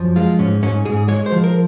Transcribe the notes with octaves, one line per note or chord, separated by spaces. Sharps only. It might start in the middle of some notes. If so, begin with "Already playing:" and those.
Already playing: F#2 F3
G#3 F4
G#2 C#4
G#2 C#4
G#2 G#4
G#3 C#5
C5
F3
A#4